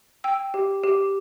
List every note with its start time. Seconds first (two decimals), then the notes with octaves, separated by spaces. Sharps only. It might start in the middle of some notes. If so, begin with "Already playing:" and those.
0.24 G5 E6
0.54 G4
0.83 G4